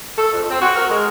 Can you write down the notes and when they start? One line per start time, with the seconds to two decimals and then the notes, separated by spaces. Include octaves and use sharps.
0.16 A4
0.32 F2
0.49 C4
0.62 F#4
0.76 A#4
0.90 G#3